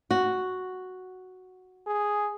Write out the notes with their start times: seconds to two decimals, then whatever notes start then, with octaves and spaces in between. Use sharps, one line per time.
0.11 F#4
1.87 G#4